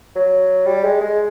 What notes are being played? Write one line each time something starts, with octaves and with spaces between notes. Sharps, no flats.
F#3
G3
G#3
G#3